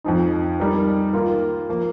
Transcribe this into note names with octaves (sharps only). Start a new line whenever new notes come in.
F2 F3 D#4
G3 D#4 A#4
D#3 A#3 F4 A#4
F3 A#3